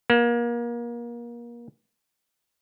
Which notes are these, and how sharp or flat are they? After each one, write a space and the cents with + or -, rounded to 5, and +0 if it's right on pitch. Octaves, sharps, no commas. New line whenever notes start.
A#3 +30